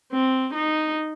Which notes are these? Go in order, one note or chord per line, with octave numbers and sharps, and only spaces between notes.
C4
D#4